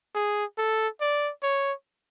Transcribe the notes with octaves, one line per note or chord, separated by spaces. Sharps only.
G#4
A4
D5
C#5